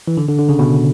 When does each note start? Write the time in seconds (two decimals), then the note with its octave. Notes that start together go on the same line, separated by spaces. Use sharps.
0.08 E3
0.17 D3
0.28 D3
0.39 D3
0.49 C#3
0.59 B2